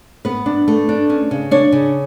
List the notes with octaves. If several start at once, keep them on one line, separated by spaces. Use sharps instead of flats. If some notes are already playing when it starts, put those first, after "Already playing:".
B3 B4
D4
A3
D4
C#4
C#3
D4 C#5
C#3